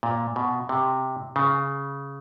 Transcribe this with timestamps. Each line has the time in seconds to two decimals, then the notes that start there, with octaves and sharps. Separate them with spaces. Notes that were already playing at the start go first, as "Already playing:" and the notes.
0.03 A#2
0.36 B2
0.69 C3
1.36 C#3